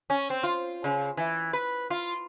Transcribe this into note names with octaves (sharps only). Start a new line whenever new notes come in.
C#4
C4
F4
C#3
E3
B4
F4